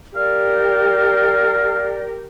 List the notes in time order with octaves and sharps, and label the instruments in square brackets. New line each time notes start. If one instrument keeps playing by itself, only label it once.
[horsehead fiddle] G4 A#4 [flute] D5 [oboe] F5